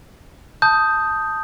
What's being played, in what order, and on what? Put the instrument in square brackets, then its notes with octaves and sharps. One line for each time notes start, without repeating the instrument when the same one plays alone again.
[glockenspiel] A5 D#6 G6